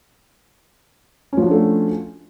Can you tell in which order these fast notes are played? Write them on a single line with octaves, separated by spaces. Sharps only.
C#4 F3 F#4 D4 A3